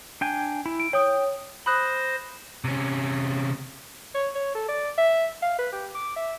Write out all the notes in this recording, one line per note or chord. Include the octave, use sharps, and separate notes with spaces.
D4 G5 G#5
E4
D7
C#5 G5 D#6
C5 B5 D#6 F#6 A#6
C3 C#4
C#5
C#5
A4
D5
E5
F5
B4
G4
D6
E5